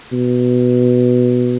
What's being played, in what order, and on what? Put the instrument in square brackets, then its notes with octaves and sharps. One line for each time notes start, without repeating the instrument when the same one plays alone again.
[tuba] B2